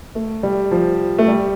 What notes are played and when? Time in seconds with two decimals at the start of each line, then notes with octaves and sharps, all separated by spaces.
0.15 A3
0.43 G3
0.71 F3
1.18 A3
1.28 G3